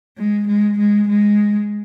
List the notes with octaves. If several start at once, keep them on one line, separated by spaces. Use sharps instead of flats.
G#3
G#3
G#3
G#3